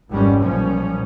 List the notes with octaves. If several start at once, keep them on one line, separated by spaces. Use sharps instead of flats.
G#1 F2 G3 G#3 B3 C#4
B1 A#2 F3 G3 C#4